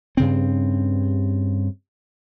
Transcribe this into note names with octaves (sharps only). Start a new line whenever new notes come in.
G2 C#3 C4